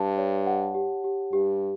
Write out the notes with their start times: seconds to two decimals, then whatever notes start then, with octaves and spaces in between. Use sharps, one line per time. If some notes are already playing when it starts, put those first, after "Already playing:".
Already playing: G2 A5
0.18 C#5
0.47 F#5
0.75 G4
1.04 G4
1.32 G2 G4